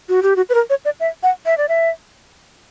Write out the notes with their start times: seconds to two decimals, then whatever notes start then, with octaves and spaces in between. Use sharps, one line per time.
0.09 F#4
0.23 G4
0.36 F#4
0.49 B4
0.54 A#4
0.70 C#5
0.85 D5
1.00 E5
1.23 F#5
1.46 E5
1.58 D5
1.69 E5